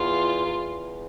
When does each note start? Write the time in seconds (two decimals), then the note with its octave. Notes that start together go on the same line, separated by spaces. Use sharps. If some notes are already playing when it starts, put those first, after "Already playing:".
Already playing: E2 F4
0.46 E2